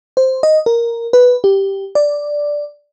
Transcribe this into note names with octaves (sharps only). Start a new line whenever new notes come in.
C5
D#5
A#4
B4
G4
D5